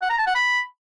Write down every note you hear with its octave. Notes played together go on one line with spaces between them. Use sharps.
F#5
A#5
A5
F#5
B5